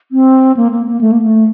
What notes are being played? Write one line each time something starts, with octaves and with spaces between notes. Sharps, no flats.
C4
A#3
A#3
A#3
A3
A#3
A3